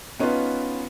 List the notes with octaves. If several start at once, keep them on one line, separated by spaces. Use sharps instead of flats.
B3 C#4 D#4 F4 B4